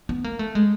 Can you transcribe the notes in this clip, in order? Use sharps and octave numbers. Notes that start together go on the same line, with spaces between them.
B3
A#3
A3
G#3